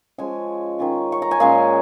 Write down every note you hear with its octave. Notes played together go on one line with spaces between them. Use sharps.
F3 G#3 C#4 G#5
D#3 C#4 F4
C#6
A#5
G#5
A#2 G#3 C#4 F5